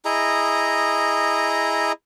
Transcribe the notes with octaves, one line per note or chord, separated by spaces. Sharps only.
E4 G#4 D#5 A#5